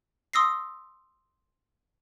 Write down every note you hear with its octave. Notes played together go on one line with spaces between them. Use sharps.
C6 D#6 E6 A#6 C7